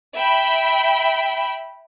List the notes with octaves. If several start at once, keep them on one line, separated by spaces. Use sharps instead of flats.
E5 G5 B5